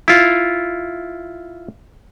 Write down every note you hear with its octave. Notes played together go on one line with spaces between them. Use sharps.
E4 F4